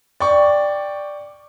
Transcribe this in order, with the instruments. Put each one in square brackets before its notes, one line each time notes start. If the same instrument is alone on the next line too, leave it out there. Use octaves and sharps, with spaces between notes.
[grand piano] D5 G5 C#6